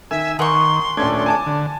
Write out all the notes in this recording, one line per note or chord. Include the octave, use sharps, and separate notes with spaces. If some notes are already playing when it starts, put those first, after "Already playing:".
D#3 E5 G#5 E6
D#3 D#4 A#4 F#5 G#5 C6 C#6
D#1 A3 C#4 D4 G#6
G#5 A5 D6
D3